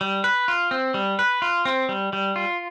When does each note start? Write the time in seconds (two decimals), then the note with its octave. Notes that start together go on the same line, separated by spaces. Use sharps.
0.01 G3
0.24 B4
0.48 F4
0.71 C4
0.94 G3
1.19 B4
1.42 F4
1.65 C4
1.89 G3
2.13 G3
2.36 F4